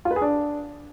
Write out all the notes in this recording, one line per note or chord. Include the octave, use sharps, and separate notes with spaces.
F4
B4
G#4
D4